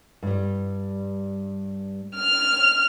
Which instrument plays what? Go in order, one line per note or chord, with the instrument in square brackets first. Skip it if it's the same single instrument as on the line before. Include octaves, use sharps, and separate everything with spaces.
[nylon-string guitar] G2 G3
[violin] F6 F7